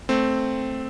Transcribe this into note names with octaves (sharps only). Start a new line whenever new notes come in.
A3 C4